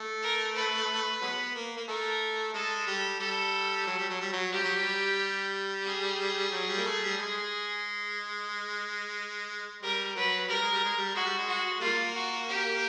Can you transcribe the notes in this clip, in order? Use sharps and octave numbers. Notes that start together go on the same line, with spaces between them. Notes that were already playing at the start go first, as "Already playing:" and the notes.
Already playing: A3
A#4
B4
F#3 G#3 B3
A#3
A#3
A3 A#4
G#3 A4
G3
G3 A4
F#3
G3
F#3
G3
F#3
G3 G4
F#3
G3
G#4
F#3
G3
A#3
A3
G3
G#3
G3 A#4
F#3 B4
G3 A#4
G#3
G3
G#3
G3
G#3 F#4
G3
G#3
F#4
G3 A#3 F4
F#4
G4